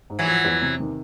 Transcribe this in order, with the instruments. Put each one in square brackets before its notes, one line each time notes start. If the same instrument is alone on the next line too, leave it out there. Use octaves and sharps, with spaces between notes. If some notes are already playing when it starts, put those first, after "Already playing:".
[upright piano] G#2
[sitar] E3 F#3
[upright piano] F3
E2
C3
D#3